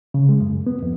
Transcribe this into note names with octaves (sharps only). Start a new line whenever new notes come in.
C#3
G#3
F#2
B3
F2